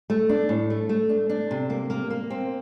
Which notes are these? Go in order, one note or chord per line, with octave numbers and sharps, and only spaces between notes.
A3
D4
A2
A3
A3
D4
D4
C3
A#3
A#3
A#3
C4